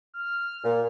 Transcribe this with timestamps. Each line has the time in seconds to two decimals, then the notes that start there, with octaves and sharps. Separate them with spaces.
0.14 F6
0.64 A#2